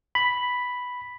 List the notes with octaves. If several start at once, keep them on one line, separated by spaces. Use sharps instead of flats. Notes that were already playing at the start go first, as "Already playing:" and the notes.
B5